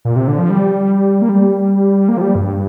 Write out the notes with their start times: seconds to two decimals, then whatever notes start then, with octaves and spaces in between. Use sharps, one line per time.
0.05 A#2
0.16 C3
0.27 D3
0.38 F3
0.50 G3
1.22 A#3
1.29 G3
2.09 A#3
2.17 F3
2.21 G3
2.35 G2